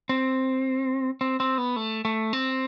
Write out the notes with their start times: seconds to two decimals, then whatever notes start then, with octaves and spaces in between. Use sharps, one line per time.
0.09 C4
1.21 C4
1.40 C4
1.58 B3
1.76 A3
2.05 A3
2.33 C4